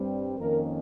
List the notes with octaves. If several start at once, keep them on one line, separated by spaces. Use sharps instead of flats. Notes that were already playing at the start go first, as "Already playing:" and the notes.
Already playing: G2 G3 C4
F2 D#3 A#3 C#4 A#4